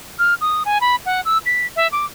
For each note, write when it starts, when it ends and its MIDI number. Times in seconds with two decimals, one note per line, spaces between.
0.19 0.34 89
0.41 0.63 87
0.65 0.81 80
0.81 0.96 83
1.05 1.21 78
1.25 1.38 88
1.46 1.66 95
1.76 1.87 76
1.92 2.05 86